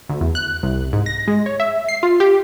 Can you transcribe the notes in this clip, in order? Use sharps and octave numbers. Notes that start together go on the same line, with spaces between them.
D2
E2
F#6
C2
G#2
A#6
G#3
C#5
E5
C7
F4
G4